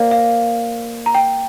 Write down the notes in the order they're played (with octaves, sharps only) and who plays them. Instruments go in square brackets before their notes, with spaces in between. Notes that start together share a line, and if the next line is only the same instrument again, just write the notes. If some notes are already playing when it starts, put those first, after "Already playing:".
Already playing: [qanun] A#3 [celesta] C5 D5
[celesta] F5
A#5
G5